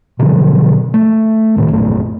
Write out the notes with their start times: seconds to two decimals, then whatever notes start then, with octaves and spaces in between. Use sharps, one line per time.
0.19 B2 D3 F3 F#3
0.94 A3
1.57 F1 A2 C3 D#3
1.72 A#1 F#2 A3